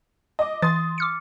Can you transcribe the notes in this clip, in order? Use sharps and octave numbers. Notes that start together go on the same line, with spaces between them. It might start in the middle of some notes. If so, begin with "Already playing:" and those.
D#5 D6
E3 C6 D#6 A6
D6 F6 C#7